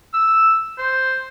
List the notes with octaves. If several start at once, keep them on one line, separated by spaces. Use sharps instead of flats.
E6
C5